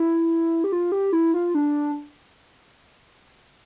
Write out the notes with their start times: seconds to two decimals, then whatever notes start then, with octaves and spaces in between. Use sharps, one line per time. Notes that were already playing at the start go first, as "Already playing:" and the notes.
Already playing: E4
0.64 G4
0.72 F4
0.92 G4
1.13 E4
1.34 F4
1.55 D4